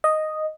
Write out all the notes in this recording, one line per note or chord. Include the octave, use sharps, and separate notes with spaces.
D#5